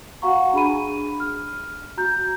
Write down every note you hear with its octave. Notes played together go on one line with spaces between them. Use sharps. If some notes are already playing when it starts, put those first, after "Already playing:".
F#4 F5 F#5 A#5 C#6
D4 G#4 B5 D#7
F6
F#4 A#5 G6